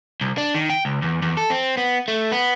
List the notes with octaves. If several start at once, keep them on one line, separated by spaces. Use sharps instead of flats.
C2
D4
D#3
G5
C#2
E2
E2
A4
C4
B3
A3
B3